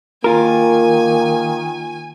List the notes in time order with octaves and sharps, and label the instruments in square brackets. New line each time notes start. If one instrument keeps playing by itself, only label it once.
[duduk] D#3 [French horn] A#3 [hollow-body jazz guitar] F4 A#4 [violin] G#5